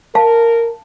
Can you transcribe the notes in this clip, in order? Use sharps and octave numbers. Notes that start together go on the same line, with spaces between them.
A#4 F5 A5